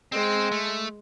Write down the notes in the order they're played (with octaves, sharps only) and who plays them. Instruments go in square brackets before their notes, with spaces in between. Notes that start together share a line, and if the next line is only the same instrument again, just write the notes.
[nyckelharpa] G#3 [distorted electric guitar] C4
[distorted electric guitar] A3